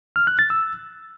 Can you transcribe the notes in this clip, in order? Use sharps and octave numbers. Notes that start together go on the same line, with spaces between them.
F6
F#6
A6
E6